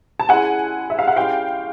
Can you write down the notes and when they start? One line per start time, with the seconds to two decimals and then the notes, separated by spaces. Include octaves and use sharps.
0.20 A5
0.29 G#3 C#4 E4 F#5 G#5
0.90 E5
0.99 F5
1.08 F#5
1.16 G#3 C#4 E4 G4 F5 G5